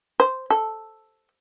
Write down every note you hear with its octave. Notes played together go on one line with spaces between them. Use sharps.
C5
A4